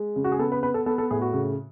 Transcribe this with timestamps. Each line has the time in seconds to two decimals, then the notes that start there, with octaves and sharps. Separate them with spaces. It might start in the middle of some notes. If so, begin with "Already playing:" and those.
Already playing: G#3
0.16 C#3
0.24 F#4
0.32 G#4
0.39 B3 A4
0.52 B4
0.63 B3 B4
0.74 A4
0.86 B3 A4
0.98 A4
1.11 A2 G#4
1.21 F#4
1.33 C#3